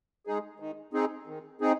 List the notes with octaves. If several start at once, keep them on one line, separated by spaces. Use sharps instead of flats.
G#3 D#4 G#4
D#3
C4 D#4 G#4
D#3
C4 D#4 G#4